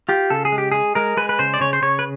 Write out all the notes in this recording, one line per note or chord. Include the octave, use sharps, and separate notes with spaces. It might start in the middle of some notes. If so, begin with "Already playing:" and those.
F4 G4
C#3 A4
G#4
G#3
G4
G#3 G#4
G#3 A#4
G#3 B4
B4
C#3 C5
D5
C#3 C#5
C5
C#3 C#5
B4